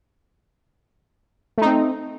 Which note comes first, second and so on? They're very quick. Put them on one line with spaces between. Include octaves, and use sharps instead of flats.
A3 D#4 C4